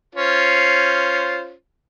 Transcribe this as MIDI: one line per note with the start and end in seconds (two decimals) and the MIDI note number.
0.15 1.52 61
0.15 1.52 65
0.15 1.52 72